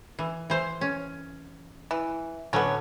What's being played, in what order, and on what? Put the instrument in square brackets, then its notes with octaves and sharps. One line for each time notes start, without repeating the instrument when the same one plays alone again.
[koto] E3
E3 C5
C#4
[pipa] E3
[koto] A2 D3 F#3 [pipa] B3 C#4